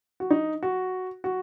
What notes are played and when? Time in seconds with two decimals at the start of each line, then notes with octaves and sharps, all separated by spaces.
0.20 F#4
0.30 D#4
0.63 F#4
1.24 F#4